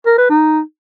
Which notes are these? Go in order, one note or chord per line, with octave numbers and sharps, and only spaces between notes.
A#4
B4
D#4